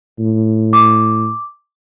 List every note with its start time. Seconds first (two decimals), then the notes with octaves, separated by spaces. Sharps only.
0.19 A2
0.73 D6